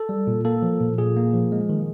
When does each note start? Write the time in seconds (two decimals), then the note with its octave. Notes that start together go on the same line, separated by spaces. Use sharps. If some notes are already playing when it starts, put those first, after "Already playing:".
Already playing: A4
0.09 G3
0.27 A#2
0.45 A#3 A4
0.62 F3
0.80 A#2
0.98 A#2 G#4
1.17 A#3
1.34 F3
1.52 G#3
1.69 D#3